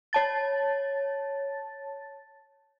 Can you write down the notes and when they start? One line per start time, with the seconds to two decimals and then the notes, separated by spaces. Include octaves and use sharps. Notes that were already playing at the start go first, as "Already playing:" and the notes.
0.13 C#5 A5 A6